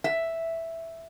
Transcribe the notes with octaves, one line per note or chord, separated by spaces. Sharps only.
E5